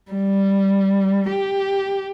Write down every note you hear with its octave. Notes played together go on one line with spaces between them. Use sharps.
G3
G4